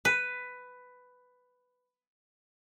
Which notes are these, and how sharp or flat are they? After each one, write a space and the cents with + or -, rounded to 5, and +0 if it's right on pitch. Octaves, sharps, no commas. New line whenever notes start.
B4 +10